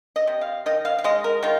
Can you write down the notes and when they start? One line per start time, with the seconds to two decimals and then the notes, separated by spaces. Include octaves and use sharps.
0.16 D#5
0.27 C3
0.41 F5
0.66 D#3 D#5
0.85 F5
0.99 F5
1.04 G#3 D#5
1.24 A#4
1.43 D#3 F4